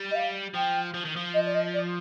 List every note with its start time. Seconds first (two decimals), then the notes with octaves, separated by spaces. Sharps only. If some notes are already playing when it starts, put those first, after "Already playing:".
Already playing: G3
0.11 D#5
0.15 F5
0.54 F3 G5
0.94 F3
1.05 D#3
1.16 F3
1.34 D#5
1.45 D5
1.54 D#5
1.73 D5